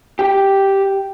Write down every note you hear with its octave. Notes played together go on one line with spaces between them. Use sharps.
G4